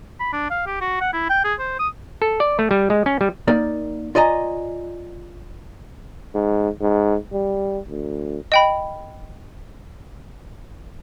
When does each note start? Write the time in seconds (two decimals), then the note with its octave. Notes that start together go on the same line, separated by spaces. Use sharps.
0.20 B5
0.33 D4
0.50 F5
0.66 G4
0.81 F#4
1.01 F#5
1.13 E4
1.29 G5
1.44 G#4
1.59 C5
1.79 D#6
2.22 A4
2.40 D5
2.59 A3
2.71 G3
2.90 G#3
3.06 C#4
3.21 G3
3.48 A#3 D#4 A#4 D5
4.15 F4 D5 D#5 G#5 A#5
6.34 G#2
6.81 G#2
7.32 G3
7.89 D2
8.52 D#5 G5 B5